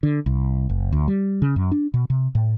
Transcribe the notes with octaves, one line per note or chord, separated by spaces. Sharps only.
D3
C2
F#1
D2
G3
C#3
F#2
D4
B2
C3
A2